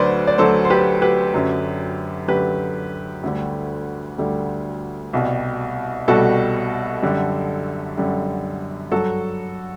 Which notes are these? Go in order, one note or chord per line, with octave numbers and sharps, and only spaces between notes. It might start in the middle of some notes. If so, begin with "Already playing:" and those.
Already playing: D2 D3 F#3 B4 C5 D5
D5
D2 D3 F#3 A4 C5
C5
G4 B4
G4 B4
F#2 D3 F#3
F#2 D3 F#3 G4 B4
D2 D3 G3
D2 D3 G3
C2 B2 G3
C2 B2 G3 F#4 A4
F#2 D3 G3
F#2 D3 G3
G2 F#3 F#4 A4